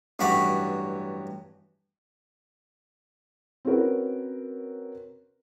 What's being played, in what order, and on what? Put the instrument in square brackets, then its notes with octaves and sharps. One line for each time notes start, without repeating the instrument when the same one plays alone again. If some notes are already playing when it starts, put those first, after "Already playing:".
[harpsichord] A1 G2 F#3 B5 C#6 D6
[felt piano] C4 C#4 F#4 A#4 B4